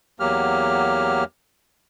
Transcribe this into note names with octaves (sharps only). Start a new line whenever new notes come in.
E2 F#3 A#3 G4 F6